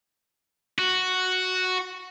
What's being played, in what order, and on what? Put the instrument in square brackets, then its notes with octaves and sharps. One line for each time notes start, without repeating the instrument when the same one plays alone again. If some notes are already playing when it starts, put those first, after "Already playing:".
[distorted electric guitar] F#4